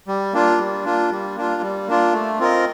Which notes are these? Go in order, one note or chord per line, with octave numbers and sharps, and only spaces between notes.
G3
A#3 D4 F4
G3
A#3 D4 F4
G3
A#3 D4 F4
G3
A#3 D4 F4
A3
C4 F4 A#4 D#5